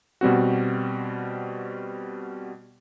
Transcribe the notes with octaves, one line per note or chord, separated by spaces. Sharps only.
B2 G3 C4 F#4